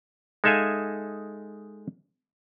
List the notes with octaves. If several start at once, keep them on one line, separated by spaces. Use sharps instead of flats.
G#3 D#4 A4 E5 F5 G#5